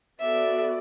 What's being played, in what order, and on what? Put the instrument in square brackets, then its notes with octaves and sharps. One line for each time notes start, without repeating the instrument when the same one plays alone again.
[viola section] B3 F#4 A4 D5 [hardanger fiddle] E5